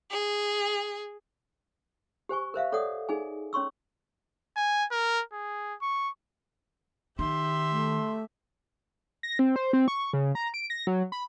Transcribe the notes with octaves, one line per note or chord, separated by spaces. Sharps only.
G#4
G4 C5 G#5 C#6
A#4 C5 E5 F5
A4 C#5 D5 F#5 D#6
D#4 G#4 G#5
C#4 C#5 C6 C#6 E6
G#5
A#4
G#4
C#6
D#3 G4 E5 C6
A3
A#6
C4
C5
C4
C#6
C#3
A#5
D7
A#6
F#3
B5